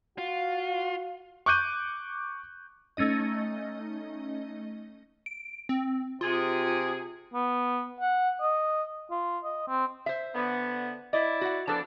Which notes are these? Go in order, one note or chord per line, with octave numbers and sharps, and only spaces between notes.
F4 F#4 F5
C#6 D6 F#6 G6 D#7
A3 C#4 D#4 D#5
D7
C4
C3 F4 G#4
B3
F#5
D#5
F4
D#5
C4
C5 E5
D3 B3
E4 D5 D#5
F#4 F#5
E3 F3 B3 D4 A4